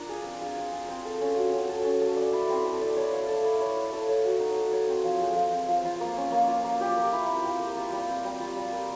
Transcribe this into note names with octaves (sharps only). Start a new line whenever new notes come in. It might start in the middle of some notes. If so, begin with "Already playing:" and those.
Already playing: D4 F4 A#4
G#4
C4
F4
C4
G#4
C4
A4
C#4
F#4
C#4
A4
C#4
A4
D5
E4
C4
A4
D5
C#5
F5
A4
E4
C#5
F5
A4
C#5
F#4
D#4
A4
C#5
C4
F3
G#3
F3
C4
F3
F4
A#3
C#4
A#3
F4
A#3
G4
A#4
E4
C4
G4
A#4
F4
G3
C4
G3
F4
G3
A#4